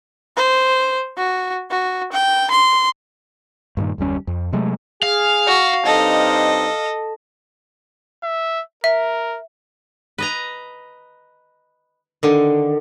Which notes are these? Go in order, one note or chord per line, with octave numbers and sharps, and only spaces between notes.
C5
F#4
F#4
G5
C6
G2 A#2 D#3
F#1 D#2 G3 C#4
F2
C3 F#3 G#3 A3
G#4 F5
F#4
G2 C4 D#4 A4 D#5
E5
A#4 E5
B4 D#5 A#5
D3 D#3